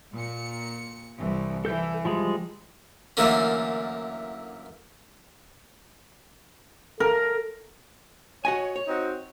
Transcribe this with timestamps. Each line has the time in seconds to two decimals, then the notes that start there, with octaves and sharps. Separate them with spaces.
0.12 A#2 C#7
1.18 C2 E3
1.65 E3 A4 G6
2.05 F3 G3 G#3
3.17 F#2 D3 E3 A3 A#3 C#4
7.00 A4 A#4
8.45 F#4 C#5 D#5 G#5
8.76 C#5
8.88 C4 D#4 F#4